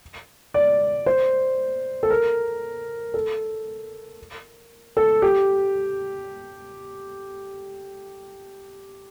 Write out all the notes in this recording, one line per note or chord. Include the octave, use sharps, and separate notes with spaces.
D5
C5
A4
A#4
A4
A4
G4